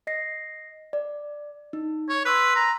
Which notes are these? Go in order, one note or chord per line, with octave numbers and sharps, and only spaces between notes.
D#5 A#6 C7
D5
D#4
C#5
B4 C6 E6 F#6
A#5